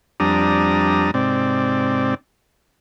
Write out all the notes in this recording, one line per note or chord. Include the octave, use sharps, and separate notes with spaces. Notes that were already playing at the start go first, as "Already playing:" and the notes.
F2 G3 D4 A#5 D#6
G#2 C3 C4 D5